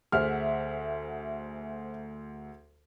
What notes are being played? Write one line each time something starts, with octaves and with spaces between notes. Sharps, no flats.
D2 G#4 C5 E5 F#5 F6